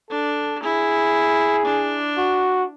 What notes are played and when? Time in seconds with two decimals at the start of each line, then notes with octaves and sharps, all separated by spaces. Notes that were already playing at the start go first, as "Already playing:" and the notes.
0.10 D4 A4
0.63 E4 G#4
1.65 D4
2.18 F#4